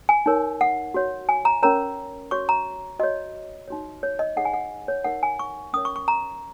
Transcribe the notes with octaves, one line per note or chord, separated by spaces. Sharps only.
G#5
D#4 A#4 C#5
F#5
F#4 C#5
G#5
A#5
C#4 A#4 C#5 A#5
F#4 C#5 C#6
A#5
F#4 C#5 D#5
D#4 F#4 C#5
C#5
D#5
D#4 G#4 C#5 F#5
G#5
F#5
C#5
D#4 A#4 C#5 F#5
G#5
C#6
C#4 A#4 C#5 D#6
C#6
C#6
A#5